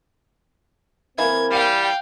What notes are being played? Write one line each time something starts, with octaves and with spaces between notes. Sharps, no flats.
E3 A#3 C4 E4 A#4 G#6
G3 F5 G5